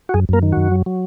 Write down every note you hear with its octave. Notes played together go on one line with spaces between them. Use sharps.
F#4
F#2 G#4
F#2 A#3 A#4
D#3
F#2 F#4
F#3
F#3